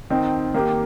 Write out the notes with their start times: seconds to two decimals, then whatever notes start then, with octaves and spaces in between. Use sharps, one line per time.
0.10 D#3 C4 D#4
0.54 D#3 A#3 G4